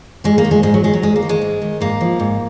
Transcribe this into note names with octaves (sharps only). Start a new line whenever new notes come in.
G#2 G#3
A#3
D#3
G#3
G#2 G#3
F#3
D#3 G#3
F#3
G#2 G#3
A#3
D#3
G#3
G#2
D#3
G#2 A#3
F3
G#2